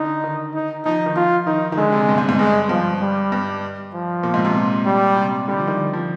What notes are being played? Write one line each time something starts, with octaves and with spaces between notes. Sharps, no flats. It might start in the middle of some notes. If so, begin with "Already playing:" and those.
Already playing: D3 D#4
D#3
D#4
F3 D#4
D#3
F3 F4
D#3 D#4
D#3
D3 G#3
C3
G2
G#2
G#2
G2 G#3
G2 F3
G3
G2
F3
A#2
G#2
C3
A#2
G3
C3
D3 G3
F3
D#3
D#3
F3